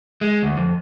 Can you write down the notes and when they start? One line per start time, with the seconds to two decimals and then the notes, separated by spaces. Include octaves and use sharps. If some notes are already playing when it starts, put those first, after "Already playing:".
0.21 G#3
0.43 D2
0.57 F2